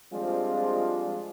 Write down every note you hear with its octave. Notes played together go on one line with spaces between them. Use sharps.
F3 G3 G#3 C4 D4 F4